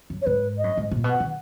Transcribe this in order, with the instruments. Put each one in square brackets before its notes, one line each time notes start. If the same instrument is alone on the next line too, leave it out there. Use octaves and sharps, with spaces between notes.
[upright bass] F#2
[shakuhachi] C#5
[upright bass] G#2 [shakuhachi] B4
[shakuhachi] D#5
[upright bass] F#2
G#2
A#2
B2
[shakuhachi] F#5
[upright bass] D#3